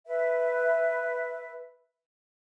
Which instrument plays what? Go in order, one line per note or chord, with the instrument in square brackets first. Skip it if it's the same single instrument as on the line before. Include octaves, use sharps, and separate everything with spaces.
[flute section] B4 E5